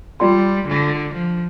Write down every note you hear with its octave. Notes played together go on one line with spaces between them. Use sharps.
G3 F4 D5 G5 C6
D3
F3